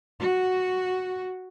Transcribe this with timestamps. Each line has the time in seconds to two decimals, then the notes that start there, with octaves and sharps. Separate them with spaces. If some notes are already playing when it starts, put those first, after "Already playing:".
0.19 F#4